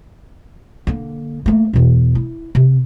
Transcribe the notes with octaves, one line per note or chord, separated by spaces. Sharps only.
D3 A#3
A3 A#3
E2 B2
E4
C3